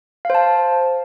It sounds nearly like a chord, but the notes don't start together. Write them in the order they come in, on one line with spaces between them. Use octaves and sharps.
F5 C5 A5